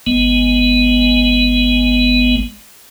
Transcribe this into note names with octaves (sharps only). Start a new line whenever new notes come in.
G#1 G#3 B3